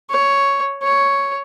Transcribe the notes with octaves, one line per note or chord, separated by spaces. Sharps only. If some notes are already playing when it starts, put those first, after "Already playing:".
C#5
C#5